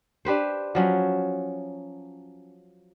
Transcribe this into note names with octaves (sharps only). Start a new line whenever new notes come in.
D4 G4 B4 C5
F3 F#3 C#4